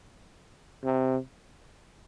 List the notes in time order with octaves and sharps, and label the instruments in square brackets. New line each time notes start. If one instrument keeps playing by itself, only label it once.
[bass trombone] C3